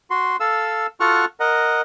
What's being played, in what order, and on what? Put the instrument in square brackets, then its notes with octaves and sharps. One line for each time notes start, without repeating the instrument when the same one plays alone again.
[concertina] F#4 C6
A4 F5 E6
F4 F#4 A4 F#5 C#6 F6
A#4 D#5 F#5